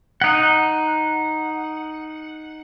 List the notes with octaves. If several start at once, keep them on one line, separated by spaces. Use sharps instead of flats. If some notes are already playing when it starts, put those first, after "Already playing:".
D#4 F#5